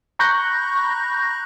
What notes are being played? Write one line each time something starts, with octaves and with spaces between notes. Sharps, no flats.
A#5 B5 C#6 F#6 G6 A#6